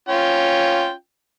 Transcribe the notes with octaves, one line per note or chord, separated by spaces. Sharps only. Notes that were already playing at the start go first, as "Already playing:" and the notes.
C#4 F4 G5